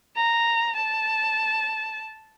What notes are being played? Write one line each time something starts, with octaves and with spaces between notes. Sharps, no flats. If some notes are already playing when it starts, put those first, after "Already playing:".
A#5
A5